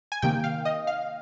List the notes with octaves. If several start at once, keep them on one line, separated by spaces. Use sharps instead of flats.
G#5
C3 D#3 A#3 G5
F5
D#5
F5